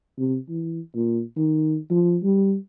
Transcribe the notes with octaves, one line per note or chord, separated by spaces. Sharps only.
C3
E3
A#2
D#3
F3
G3